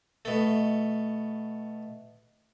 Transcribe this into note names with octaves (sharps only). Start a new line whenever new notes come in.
B2 A3